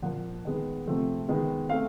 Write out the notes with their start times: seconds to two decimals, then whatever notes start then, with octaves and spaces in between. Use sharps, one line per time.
0.02 A#2 F3 A#3 F#5
0.45 D#3 G#3 B3
0.87 C3 F3 A3 C4
1.29 D#3 G#3 B3
1.69 A3 C4 F5